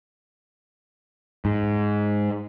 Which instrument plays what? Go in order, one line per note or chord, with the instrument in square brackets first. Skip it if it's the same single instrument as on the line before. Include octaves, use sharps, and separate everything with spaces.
[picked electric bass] G#2